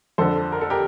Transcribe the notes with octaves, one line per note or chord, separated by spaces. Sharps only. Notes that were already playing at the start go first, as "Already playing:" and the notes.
F2 D3 A4 C5
A#4
A4
G4 A#4